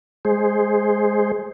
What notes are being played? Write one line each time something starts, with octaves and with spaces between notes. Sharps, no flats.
G#3 G#4 C5